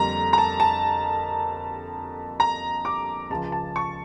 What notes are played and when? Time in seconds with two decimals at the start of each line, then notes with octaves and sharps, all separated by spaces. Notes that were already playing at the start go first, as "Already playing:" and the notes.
Already playing: F2 D3 G3 A#3 A#5
0.33 A#5
0.38 A5
0.60 A5
2.40 A#5
2.85 D6
3.30 C#2 C#3 F3 A5
3.52 A5
3.76 C#6